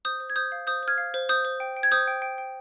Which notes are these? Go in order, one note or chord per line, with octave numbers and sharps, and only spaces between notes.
C5 D#6 G6
C5
G#6
C5 D#6 G6
F5
C5 D#6 G6
C5 F6 G#6
F5
C5
C5 D#6 G6
C5
G5
G5
G#6
C5 D#6 G6
G5
G5
G5